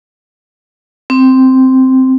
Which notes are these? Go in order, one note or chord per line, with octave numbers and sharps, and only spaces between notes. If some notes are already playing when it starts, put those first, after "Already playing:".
C4